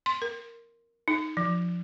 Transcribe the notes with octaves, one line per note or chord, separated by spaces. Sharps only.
C6
A#4
D#4
F3